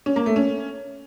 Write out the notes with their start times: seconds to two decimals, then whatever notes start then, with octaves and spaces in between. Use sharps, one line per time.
0.06 C#4
0.16 A#3
0.26 A3
0.36 C#4